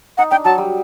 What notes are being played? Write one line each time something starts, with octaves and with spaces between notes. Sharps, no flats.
D#4 F#5
D4 G5
F#3 A5
G3